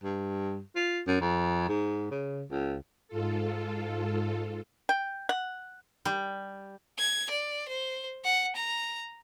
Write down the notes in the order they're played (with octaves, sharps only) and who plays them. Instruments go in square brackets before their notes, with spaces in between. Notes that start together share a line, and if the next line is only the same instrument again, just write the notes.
[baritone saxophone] G2
F4
F#2
F2
G#2
C#3
C#2
[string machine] G#2 F4 A4
[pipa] G5
F#5
[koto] G3
[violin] G#6
D5
C5
F#5
A#5